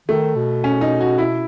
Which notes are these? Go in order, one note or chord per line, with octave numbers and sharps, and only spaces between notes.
D#3 A3
B2
C#4
D#4
F#4
E4